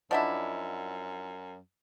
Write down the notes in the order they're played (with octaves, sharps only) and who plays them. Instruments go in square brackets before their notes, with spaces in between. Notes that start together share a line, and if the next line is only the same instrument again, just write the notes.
[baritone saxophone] F#2 [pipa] F3 D4 E4 [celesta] D5 D#5 F#5